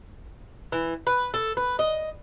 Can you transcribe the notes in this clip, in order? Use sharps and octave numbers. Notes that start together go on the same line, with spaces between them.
E3
B4
A4
B4
D#5